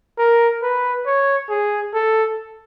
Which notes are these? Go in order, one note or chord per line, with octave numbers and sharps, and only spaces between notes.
A#4
B4
C#5
G#4
A4